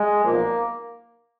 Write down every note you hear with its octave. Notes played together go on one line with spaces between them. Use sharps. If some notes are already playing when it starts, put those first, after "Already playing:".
Already playing: G#3
B1 A#2 F3 A#3